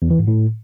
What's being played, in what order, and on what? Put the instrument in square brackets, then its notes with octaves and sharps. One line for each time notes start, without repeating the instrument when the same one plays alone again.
[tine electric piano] E2
E3
G#2
A2